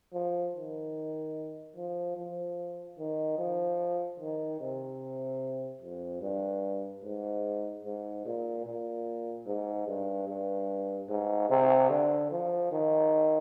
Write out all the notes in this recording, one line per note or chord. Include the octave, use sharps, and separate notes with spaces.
F3
D#3
F3
F3
D#3
F3
D#3
C3
F2
G2
G#2
G#2
A#2
A#2
G#2
G2
G2
G#2
C3
D3
F3
D#3